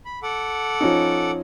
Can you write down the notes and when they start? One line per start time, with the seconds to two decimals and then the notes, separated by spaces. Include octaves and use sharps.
0.05 B5
0.23 A4 F#5 D6
0.81 F3 C#4 D#4